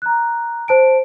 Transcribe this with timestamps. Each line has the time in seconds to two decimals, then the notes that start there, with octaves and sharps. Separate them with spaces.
0.02 A#5 F#6
0.68 C5 A5 D7